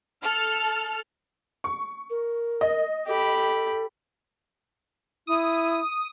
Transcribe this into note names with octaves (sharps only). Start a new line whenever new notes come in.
A4 F6
C#6
A#4
D#5
G4 A4 B5
E4 D#6